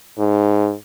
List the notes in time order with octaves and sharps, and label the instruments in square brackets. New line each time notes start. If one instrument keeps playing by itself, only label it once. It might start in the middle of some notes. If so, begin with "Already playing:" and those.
[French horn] G#2